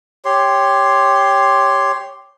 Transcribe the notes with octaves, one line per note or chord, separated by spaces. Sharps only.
G4 C#5 C6